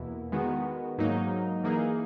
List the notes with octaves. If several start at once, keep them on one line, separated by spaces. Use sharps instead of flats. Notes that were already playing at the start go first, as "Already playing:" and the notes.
Already playing: E2 B2 A#3 E4
D#3 G#3 B3 F#4
G#2 F#3 A#3 D#4
E3 A#3 D#4 G#4